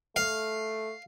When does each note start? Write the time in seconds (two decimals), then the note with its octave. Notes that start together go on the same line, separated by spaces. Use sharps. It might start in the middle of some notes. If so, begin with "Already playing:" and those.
0.16 A3 F5